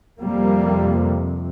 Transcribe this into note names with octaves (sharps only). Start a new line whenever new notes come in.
F2 C3 G3 A#3